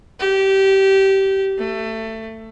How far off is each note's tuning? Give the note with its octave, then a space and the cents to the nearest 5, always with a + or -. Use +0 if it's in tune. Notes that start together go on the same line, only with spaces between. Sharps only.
G4 -20
A3 +20